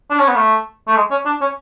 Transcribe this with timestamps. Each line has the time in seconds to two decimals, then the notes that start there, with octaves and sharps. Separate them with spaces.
0.10 D4
0.19 C#4
0.28 B3
0.36 A3
0.88 A3
0.96 G#3
1.11 C#4
1.25 D4
1.41 C#4